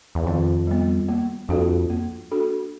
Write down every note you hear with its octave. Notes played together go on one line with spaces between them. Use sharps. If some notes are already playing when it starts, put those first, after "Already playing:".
E2
F2 D#3
G3 B3
A#3
F2 D4 F#4 A4
A#3
D4 F#4 A4